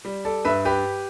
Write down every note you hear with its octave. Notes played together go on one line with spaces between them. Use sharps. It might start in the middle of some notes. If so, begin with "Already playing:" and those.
G3
A4 D5
G2 B4 E5
G4 B4